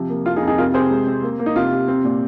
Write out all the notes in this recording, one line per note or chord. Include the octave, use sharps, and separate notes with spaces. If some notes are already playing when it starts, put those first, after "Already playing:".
Already playing: C3 F3
A#3
F2 F4
D#4 G#4
F2
D#4 G#4
C3 F4 A#4
C3 G#4 C5
G#3
C4
A#3
A#3
D#4
C3 F4
C3
C4
A#2